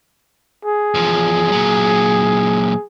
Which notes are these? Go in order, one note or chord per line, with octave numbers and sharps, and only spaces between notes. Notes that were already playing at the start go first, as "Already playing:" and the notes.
G#4
E2 F3
A#2 F#3